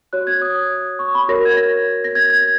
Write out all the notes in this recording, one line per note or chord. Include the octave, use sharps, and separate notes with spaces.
F#4 C#5 F#6
G#6
D#6
C#6
B5
F#4 A#4 C#5 A#6
G#6
A#6
A#6
G#6
G#6